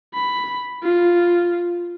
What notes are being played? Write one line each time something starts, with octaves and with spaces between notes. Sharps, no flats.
B5
F4